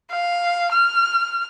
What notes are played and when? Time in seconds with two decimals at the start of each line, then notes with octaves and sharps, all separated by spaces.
0.11 F5
0.72 F6